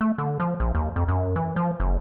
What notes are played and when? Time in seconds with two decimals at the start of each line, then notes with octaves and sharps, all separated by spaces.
0.01 A3
0.18 D3
0.40 F3
0.60 A#1
0.75 D#2
0.96 F2
1.08 F#2
1.36 E3
1.56 F3
1.80 F#1